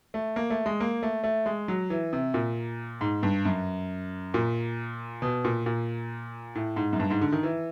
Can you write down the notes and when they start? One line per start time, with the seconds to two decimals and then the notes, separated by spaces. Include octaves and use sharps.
0.14 A3
0.36 A#3
0.50 A3
0.66 G#3
0.80 A#3
1.03 A3
1.23 A3
1.46 G#3
1.68 F#3
1.90 E3
2.13 C3
2.34 A#2
3.01 G#2
3.23 G2
3.45 F#2
4.34 A#2
5.22 B2
5.45 A#2
5.66 A#2
6.55 A2
6.76 G#2
6.93 F#2
7.00 G2
7.10 G#2
7.21 D3
7.32 D#3
7.43 E3